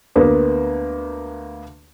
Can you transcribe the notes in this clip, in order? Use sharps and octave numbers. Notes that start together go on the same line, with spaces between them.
D2 A#3 B3